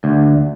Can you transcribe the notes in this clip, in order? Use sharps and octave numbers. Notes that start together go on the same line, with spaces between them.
D2